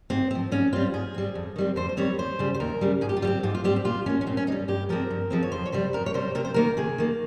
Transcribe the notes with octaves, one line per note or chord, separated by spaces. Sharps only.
G#2 C4
F3 C4
G#2 C#4
G3 C4 F4
G#2 G#4
G3 C4
F2
D#3 G3 C4
F2 C5
C5
D#3 G3 C4 C#5
D#2 C5
C#3 G3
C5
D#2 A#4
C#3 G3
G#2 G#4
G4
F4
G3 C4 G4
G#2 F4
F4
G3 C4 G4
G4
A#2 F4
G3 A#3 C#4
C#4
A#2 C4
C#4
A#3 D#4
G3
G2 G4
F3 G#3 C4 A#4
G2
F3 G#3 C4
C#5
F2 C5
C#5
C3 G3 C5
F2 A#4
C#5
C3 G3 C5
C3 A#4
C5
D#3 A#3 A#4
C3 G#4
D#3 A#3